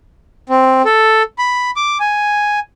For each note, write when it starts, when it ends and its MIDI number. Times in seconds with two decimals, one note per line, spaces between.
0.49 0.82 60
0.85 1.22 69
1.38 1.71 83
1.76 1.98 86
2.00 2.59 80